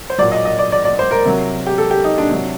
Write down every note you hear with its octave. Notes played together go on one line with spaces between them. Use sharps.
C5
A#2 F#3 D5
D#5
D#5
D5
D5
D5
C5
A#4
C3 F#3
G4
A4
G4
D#4
D4
C3 F#3 D4